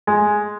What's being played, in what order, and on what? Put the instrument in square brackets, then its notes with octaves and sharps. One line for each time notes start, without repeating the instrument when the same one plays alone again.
[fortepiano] G#3